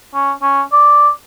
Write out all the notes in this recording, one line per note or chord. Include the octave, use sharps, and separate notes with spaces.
C#4
C#4
D5